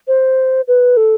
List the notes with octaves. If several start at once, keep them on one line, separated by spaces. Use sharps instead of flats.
C5
B4
A4